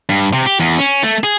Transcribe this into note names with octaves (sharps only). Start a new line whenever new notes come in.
G2
C3
G4
E2
C#4
A3
G#4